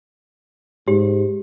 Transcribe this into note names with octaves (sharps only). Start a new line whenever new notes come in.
G#2 G4